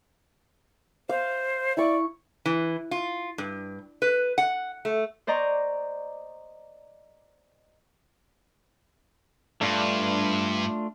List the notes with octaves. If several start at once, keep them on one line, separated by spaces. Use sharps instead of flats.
C5 F5
E4 D5 C#6
E3
F4
G2
B4
F#5
A3
C5 D5 D#5 A#5 C6 C#6
G2 A3 D4 F4